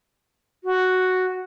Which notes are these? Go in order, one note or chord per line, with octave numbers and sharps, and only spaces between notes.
F#4